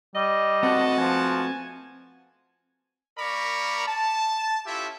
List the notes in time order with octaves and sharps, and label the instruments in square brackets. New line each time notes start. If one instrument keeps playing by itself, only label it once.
[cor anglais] G3 [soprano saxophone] D#5
[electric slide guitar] A3 C4 B4 [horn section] F#4 F#5 A5
[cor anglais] F3 [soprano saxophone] G#5
[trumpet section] A#3 A#4 D5 A#5 B5 C#6
A5
C#4 E4 F4 G4 A4 E5